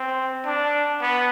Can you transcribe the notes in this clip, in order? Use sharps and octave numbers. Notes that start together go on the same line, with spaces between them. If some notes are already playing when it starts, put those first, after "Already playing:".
Already playing: C4
D4
B3